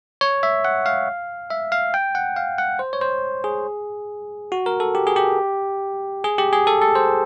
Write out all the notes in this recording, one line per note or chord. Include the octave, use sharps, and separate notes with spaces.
C#5
E5
F#5
F5
E5
F5
G5
F#5
F5
F#5
C5
C#5
C5
G#4
F#4
A#4
A4
G4
G#4
G4
G#4
G4
G#4
A4
A4
C5